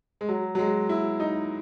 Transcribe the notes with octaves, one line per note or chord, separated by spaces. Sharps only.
G#3
F#3
F#3
G#3
E4
D#4